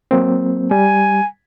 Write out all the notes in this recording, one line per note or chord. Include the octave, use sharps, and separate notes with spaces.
F#3 A#3 C4
G3 G#5